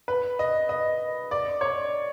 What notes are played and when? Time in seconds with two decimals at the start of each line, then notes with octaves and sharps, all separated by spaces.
0.08 B4
0.39 D#5
0.69 D#5
1.31 D5
1.61 C#5